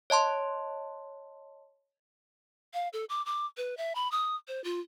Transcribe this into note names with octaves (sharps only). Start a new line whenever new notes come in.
C#5 D#5 A5 C6
F5
A4
D6
D6
B4
E5
B5
D#6
C5
F4